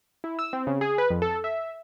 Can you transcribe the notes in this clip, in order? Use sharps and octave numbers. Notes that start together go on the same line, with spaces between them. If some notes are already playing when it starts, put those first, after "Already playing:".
E4
E6
C4
C#3
G#4
B4
F2
A4
E5